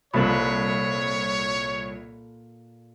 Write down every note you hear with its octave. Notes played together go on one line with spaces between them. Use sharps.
C2 A#2 F3 A4 C#5 B5 D#6 F#6